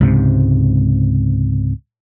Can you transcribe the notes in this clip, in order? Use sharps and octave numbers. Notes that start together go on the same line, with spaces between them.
C#2 G#2 C3